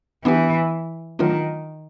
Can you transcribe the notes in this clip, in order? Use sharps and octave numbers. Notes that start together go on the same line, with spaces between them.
E3 B3 D4 G4
D#3 F#3 A3 D4 F4 A#4